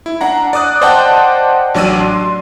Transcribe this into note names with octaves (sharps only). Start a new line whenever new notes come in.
E4
D4 F#5 A#5
D5 D6 D#6 F#6
C5 D5 D#5 F#5 G5 A5
A1 F#3 D4 D5 E6 D#7
C6